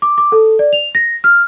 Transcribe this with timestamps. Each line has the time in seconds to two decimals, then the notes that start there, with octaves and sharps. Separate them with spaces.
0.02 D6
0.18 D6
0.32 A4
0.59 D5
0.73 F7
0.95 A#6
1.24 F6